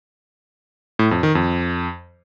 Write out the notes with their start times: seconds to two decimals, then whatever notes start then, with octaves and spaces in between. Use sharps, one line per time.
0.99 A2
1.11 F2
1.23 D#3
1.35 F2